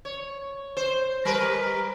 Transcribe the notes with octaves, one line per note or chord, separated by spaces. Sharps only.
C#5
C5
G3 A#4 B4